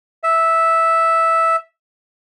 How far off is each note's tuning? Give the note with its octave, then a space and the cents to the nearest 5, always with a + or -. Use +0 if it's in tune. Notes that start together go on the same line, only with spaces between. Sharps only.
E5 -5